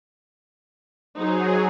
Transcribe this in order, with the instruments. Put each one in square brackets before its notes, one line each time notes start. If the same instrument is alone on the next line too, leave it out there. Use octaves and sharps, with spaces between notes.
[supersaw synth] F#3 G#4 [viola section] D#4 C5